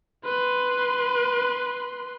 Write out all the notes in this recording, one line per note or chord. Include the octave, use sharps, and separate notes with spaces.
B4 C6